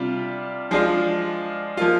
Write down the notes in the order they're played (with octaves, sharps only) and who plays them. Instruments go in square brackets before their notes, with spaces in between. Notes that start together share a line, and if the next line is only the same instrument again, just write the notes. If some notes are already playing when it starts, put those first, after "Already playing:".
Already playing: [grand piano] C3 G3 D4 F4
F3 G#3 D4 F4
F3 A#3 F4